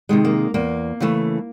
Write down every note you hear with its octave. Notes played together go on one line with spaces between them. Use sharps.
C3 D#3 G#3
A#3
E2 A#3
C#3 E3 A3